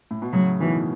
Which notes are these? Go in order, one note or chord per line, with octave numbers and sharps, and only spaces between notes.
A2
B2
A2 C#3 F#3
B2 D#3 E3